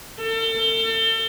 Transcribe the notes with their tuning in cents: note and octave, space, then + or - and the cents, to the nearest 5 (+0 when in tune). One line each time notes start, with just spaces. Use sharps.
A4 +35